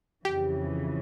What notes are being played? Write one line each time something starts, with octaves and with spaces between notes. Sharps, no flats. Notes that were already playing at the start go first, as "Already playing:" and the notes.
F2 C#3 E3 G4